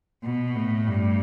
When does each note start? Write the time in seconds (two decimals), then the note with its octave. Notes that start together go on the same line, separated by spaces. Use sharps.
0.24 B2
0.55 A2
0.87 G2